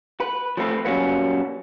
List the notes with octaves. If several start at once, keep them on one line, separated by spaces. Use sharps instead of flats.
B4
F3 A3 C4 B4
F#2 A#2 F#3 G3 A#3 B3